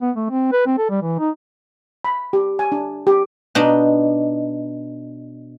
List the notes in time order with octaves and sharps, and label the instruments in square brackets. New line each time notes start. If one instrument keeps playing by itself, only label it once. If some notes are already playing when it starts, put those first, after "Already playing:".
[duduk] B3
A3
C4
B4
C4
A4
G3
E3
D#4
[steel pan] B5
G4
G#5
D4
G4
[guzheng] B2 D4 D#4